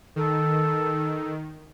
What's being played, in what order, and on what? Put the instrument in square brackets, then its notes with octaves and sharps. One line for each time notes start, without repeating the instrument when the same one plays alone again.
[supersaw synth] D#3 [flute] A4